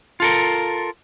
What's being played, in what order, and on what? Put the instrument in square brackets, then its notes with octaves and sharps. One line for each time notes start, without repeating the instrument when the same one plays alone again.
[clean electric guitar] F4 A4 A#4